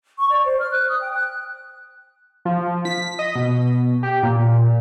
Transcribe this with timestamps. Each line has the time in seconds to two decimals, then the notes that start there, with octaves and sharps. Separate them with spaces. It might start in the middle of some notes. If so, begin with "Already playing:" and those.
0.18 C#6
0.30 D5
0.45 C5
0.60 F6
0.72 F#6
0.88 D#6
1.01 G5
1.14 F#6
2.45 F3
2.85 B6
3.19 D#5
3.36 B2
4.03 G4
4.23 A#2